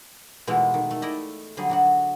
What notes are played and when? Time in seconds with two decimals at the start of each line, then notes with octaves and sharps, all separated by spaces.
0.47 B2 E3 G#3 A3 E4 F4
0.74 D#3
0.91 A3
1.02 E4 D5 D#5
1.57 D3 F#3 G3 G#4
1.69 F#3 D4 F#4